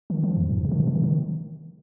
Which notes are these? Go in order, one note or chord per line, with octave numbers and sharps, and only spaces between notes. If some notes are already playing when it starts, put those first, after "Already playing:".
D#3
F3
F2
G#2
C3
D#3
C3
D#3
C3
D#3